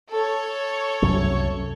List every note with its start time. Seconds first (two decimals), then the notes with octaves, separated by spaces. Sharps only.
0.10 A4 C#5
1.02 C2 F#2 F#3